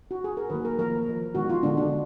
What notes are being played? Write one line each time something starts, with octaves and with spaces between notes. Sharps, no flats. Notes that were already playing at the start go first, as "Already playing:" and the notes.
F#4
G#4
A#4
D#3 F#3 A#3 B4
A#4
F3 A#3 A#4
F3 A#3
D#3 G#3 B3 F#4
F4
D3 G#3 B3 D4
D4